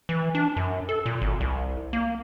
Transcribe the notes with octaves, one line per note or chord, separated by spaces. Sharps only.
E3
D4
F#2
A4
A#2
G#1
C2
A#3